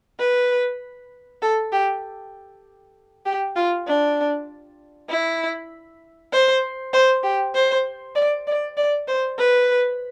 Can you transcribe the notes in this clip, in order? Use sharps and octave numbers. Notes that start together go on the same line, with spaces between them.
B4
A4
G4
G4
F4
D4
E4
C5
C5
G4
C5
D5
D5
D5
C5
B4